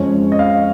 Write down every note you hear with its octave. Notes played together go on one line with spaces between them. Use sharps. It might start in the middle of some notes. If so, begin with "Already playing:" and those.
Already playing: F2 F3 G#3 C#4 C#5
D#5
F5